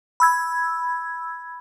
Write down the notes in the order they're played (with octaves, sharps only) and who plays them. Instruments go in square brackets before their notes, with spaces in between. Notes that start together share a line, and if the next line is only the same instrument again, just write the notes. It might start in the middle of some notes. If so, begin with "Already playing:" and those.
[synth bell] B5 E6 G#6